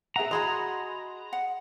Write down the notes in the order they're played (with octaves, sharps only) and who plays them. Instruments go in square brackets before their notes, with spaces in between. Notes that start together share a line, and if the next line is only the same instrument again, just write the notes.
[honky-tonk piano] G#4 E5 F#5 [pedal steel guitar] A#5
[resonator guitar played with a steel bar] F#4 G#4 D#5 [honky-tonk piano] B5 C6 D#6
[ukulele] F#5